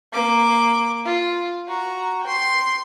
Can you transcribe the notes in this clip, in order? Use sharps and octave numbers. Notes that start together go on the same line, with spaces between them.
A#3 D6
F4
F#4 A#5
G5 C6